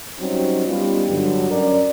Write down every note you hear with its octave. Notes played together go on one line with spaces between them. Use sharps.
F#3 G3 C4 C#4 D#4 F#4
G3 B3 C#4 D#4 F4
G2 D3 F#3
F#2 C#4 A#4 D5